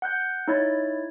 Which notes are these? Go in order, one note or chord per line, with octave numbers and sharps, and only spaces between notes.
F#5 F#6 G6
D#4 E4 C#5 B5 G#6 A6